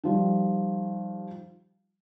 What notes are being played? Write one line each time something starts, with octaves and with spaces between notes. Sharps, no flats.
D#3 F3 G3